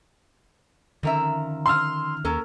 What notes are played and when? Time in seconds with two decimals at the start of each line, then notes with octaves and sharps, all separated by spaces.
1.03 F2 D3 D#3 C#4 A#4 E5
1.66 C6 E6 F6
2.25 D#2 A#3 C#4 A4 A#4